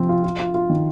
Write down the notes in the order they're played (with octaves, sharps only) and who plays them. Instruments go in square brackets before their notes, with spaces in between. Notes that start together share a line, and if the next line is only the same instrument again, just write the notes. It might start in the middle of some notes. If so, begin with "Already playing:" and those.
Already playing: [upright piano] C3 F3 C4
F4
F4
F4
F4
D#3